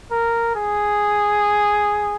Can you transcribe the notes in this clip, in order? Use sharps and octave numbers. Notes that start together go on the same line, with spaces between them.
A#4
G#4